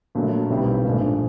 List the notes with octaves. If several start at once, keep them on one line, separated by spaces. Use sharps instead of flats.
A#1 A#2 F#3 A3
B1 B2 G3 C4 E4
A#1 G#2 F3 A3 D4